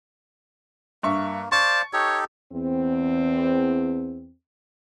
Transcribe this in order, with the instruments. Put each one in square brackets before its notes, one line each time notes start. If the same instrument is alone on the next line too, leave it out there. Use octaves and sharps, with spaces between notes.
[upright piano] G2 E5 C#6 [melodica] A#3
[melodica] C5 D5 F5 [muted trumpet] A5 [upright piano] C#6
[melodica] D#4 G4 A4 [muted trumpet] C#5
[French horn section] E2 C4